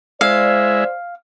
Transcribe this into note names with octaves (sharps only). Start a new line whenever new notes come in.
G#3 E4 C5 D5 E5 F5